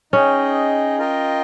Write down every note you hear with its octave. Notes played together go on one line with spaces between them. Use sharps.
C#4 D#4 G#4 D#5 G5
F4 A#4 D#5 G5